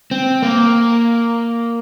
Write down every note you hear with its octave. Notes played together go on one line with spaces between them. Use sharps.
C4
A#3